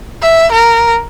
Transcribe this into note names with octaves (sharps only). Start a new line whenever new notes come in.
E5
A#4